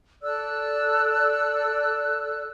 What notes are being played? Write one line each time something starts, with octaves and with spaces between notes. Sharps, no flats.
A4 D5 E6 F#6